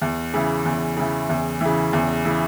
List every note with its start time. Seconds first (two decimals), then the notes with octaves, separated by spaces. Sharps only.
0.02 E2
0.34 C#3 E3
0.66 E2
0.97 C#3 E3
1.29 E2
1.61 C#3 E3
1.93 E2
2.25 C#3 E3